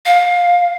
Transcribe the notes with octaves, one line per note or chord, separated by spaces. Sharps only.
F5